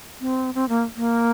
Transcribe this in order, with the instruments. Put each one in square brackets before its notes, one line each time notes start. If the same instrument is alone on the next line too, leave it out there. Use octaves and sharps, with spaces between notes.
[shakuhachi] C4
C4
A#3
A#3